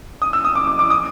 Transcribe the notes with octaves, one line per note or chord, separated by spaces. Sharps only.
D#6
E6
D#6
D6
D6
D6
D#6